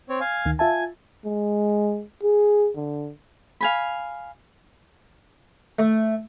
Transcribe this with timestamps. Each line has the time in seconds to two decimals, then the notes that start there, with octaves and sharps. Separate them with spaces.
0.09 C4 C#5
0.20 F5 G#5
0.46 D2 D#3
0.59 F4 E5 G#5 A5
1.26 G#3
2.23 G#4
2.77 D3
3.61 F5 G#5 B5
5.79 A3